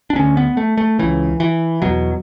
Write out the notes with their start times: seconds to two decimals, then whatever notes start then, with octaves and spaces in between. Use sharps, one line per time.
0.10 D4
0.15 D2 D3 C#4
0.37 B3
0.57 A3
0.77 A3
0.99 C#2 C#3 E3
1.40 E3
1.82 E2 B2 F#3